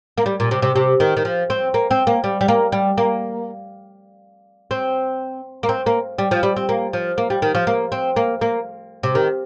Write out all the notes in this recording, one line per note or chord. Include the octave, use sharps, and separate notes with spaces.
A#3
G3
A#2
C3
C3
C3
D#3
D#3
F3
C4
A#3
C4
A#3
G3
G3
A#3
G3
A#3
C4
A#3
C4
A#3
G3
F3
G3
C4
A#3
F3
A#3
G3
D#3
F3
A#3
C4
A#3
A#3
C3
D#3